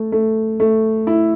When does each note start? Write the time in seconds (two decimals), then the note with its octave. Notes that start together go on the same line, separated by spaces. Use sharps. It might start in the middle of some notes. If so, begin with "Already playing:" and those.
Already playing: A3
0.12 A3
0.60 A3
1.07 E4